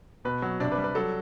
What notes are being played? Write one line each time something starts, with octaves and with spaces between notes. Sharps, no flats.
B2 B4
F#3
C3 D4 D5
B4
G3
B4
F#3 A4